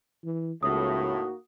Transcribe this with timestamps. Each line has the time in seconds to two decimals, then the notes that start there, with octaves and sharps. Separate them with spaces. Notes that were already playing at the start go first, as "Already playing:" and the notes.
0.24 E3
0.63 C#2 A2 A#3 D#4 F#4 D#6